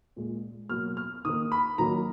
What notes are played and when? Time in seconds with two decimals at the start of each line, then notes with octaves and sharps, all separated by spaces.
0.16 A#2 G#3
0.69 B2 F#3 A#3 F6
0.97 F6
1.25 D#3 A#3 D#6
1.52 B5
1.78 D#3 F#3 A#3 A#5